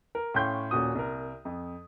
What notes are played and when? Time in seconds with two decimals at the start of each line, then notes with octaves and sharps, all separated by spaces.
0.15 A#4
0.34 A2 C#4 F5 G5 C6 G6
0.71 D#1 A#2 C#4 F#4 D#6
0.95 C2 A#4
1.45 F2